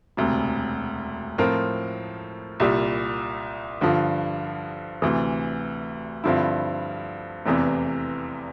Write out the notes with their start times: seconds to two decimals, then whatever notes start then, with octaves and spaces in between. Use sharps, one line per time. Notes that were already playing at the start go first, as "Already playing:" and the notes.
0.17 E1 D2 C3
1.38 A2 F3 C4 F4 A#4
2.60 C2 A#2 G3
3.81 G2 D3 F3
5.02 D2 C3 E3
6.24 G2 D3 F3 C4 E4
7.46 F1 E2 C3 E3